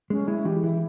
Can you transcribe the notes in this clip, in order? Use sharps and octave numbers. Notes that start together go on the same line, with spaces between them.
G#3 C#4
G#3 E4
E3 G4
E3 E4